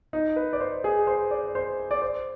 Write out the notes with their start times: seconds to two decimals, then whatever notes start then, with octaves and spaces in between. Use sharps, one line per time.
0.13 D#4
0.36 B4
0.53 D5
0.60 C5
0.84 G#4
1.07 C5
1.31 D5
1.55 C5
1.91 D5
2.02 C5